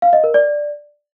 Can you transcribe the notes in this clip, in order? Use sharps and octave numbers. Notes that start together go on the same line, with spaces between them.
F5
D#5
A#4
D5